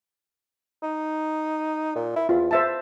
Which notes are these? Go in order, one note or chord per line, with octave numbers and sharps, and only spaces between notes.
D#4
A#2
E4
E2 F4
C5 E5 A5